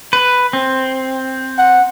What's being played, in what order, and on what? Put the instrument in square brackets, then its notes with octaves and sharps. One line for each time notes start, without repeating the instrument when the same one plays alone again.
[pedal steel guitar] B4
C4
[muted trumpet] F#5